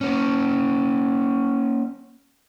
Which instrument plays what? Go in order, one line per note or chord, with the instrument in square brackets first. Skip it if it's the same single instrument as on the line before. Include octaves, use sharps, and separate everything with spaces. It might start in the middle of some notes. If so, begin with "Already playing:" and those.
[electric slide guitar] A#3 C#4